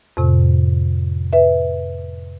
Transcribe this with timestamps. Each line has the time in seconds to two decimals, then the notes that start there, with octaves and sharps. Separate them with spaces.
0.17 F2 A2 C3
1.33 B4 E5